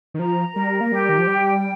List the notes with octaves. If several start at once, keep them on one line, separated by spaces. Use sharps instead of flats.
D#3
F3 A#5
G3 A#4
A#3
G3 G4
D#3
F3
G3 G5